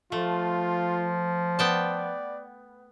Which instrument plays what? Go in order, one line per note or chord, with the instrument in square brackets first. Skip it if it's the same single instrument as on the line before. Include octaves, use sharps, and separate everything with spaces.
[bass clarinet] F3 [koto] A3 [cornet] F4
[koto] B3 G5 A5 [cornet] D5